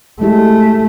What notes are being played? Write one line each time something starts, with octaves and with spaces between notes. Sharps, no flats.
G#3 A3 E4 G4